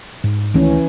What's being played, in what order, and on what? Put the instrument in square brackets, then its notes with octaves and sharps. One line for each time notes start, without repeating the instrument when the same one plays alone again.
[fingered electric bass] G#2
[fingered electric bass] C#2 D#3 A3 [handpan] E3 C#4